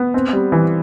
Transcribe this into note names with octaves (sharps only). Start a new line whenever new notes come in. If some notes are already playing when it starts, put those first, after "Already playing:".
Already playing: B3
C4
G3
E3